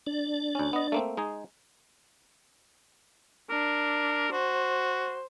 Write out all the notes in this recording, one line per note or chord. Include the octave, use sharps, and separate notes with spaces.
D4 D5
D2 C#4
B3 D#5
A3 A#3 C4
G#3 D#4 G#4
D4 A#4
F#4 C5